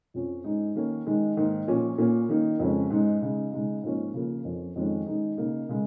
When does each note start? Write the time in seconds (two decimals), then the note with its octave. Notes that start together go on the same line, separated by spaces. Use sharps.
0.14 F2 F3 C#4
0.44 G#2 G#3 D#4
0.75 D#3 A#3 C#4
1.07 D#3 G#3 D#4
1.37 G#2 D#3 A#3 D#4
1.67 A#2 F3 C#4
1.98 A#2 A#3 C#4
2.29 D#3 A#3 D#4
2.59 F2 C#3 G#3 C#4
2.90 G#2 G#3 D#4
3.22 C#3 G#3 D#4
3.52 C#3 G#3 D#4
3.83 G#2 F3 A#3 C#4
4.14 C#3 F3 A#3
4.45 F2 F3 C#4
4.76 F2 D#3 G#3 C#4
5.06 D#3 G#3 D#4
5.37 C#3 A#3 D#4
5.69 C#3 G#3